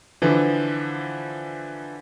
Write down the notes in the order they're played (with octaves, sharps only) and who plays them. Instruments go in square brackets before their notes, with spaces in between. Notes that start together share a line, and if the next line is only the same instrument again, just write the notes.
[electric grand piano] D3 E3 F3